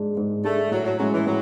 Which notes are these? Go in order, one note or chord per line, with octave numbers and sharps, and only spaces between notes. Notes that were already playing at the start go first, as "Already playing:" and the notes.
Already playing: G#2 G#3 D4 G#4
G#2
G#3 A3 D4 G#4
A2 F#3
F#3
F#3 G#3 C#4 E4
E3
A2 F#3